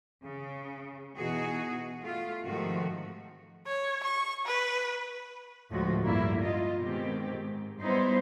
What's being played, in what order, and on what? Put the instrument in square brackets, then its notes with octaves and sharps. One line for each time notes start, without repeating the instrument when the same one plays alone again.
[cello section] C#3
B2 E3 D#4 F#4 G#4
A3 F4
G#2 C3 D#3 F3 A3 F#4
[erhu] C#5
C#6
B4
[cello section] D2 A2 F3 G#3 F#4
G2 D3 A#3 E4
F4 D#5
B2 D#3 G#3 C4 G4
G#2
F#3 G3 B3 D#4 E4 C5